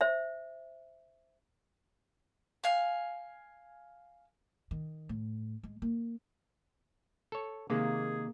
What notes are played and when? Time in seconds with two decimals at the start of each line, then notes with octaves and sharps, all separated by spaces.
0.01 C5 E5
2.64 F5 G#5
4.71 D#3
5.09 A2
5.63 G#3
5.82 A#3
7.32 A4 C#5
7.70 C3 D#3 G#3 A#3 G#4